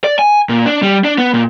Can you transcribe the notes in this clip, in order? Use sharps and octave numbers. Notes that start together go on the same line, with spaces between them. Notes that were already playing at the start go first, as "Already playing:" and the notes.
D5
G#5
A#2
D4
G3
D4
B3
A#2